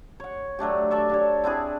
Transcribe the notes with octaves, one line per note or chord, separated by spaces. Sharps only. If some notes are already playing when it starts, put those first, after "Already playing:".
C#5 F#5
F#3 A3 D4 G4
A4 D5 E5 C#6
D4 G4 C#5
C4 D4 E4 G#4